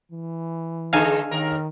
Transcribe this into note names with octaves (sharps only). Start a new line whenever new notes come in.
E3
D3 G#3 D4 D#4 A4 F5 G#5
D#2 D#3 A#4